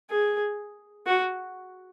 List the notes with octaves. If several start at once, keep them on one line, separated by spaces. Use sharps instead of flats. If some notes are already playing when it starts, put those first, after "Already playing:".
G#4
F#4